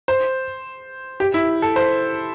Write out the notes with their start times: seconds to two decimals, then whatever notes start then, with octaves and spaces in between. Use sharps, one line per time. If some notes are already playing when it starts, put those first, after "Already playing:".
0.08 C5
1.20 G4
1.34 E4
1.62 A4
1.76 C5